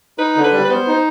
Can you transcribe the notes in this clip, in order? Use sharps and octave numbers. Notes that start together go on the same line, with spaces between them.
D#4 B4
D3
B4
G3
B4
B3 C5
D#4